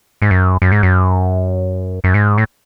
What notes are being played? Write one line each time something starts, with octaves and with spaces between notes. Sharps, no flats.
G#2
F#2
F#2
G#2
F#2
F#2
G#2
A2